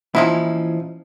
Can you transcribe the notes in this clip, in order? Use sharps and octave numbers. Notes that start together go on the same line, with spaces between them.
A#2 E3 F3 C#4 D#4 E4